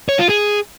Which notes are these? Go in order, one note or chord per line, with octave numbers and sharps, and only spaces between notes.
C#5
F4
G#4